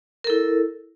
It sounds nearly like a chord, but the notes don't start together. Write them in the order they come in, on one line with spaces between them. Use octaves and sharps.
A#4 A4 E4